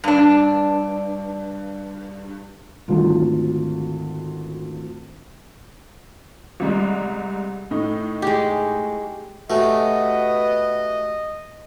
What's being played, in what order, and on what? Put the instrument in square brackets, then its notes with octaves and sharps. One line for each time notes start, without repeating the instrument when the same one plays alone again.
[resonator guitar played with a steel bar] G2 D4
[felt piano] G#1 D2 F4
[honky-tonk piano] C2 G3 G#3
A2 D#4
[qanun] G#3 G4
[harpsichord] A2 A3 [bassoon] B3 [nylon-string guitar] F#4 G4 G#5 [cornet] D#5